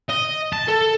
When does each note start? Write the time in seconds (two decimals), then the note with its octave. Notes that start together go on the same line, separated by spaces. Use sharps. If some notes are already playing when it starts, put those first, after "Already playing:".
0.09 D#5
0.53 A5
0.68 A4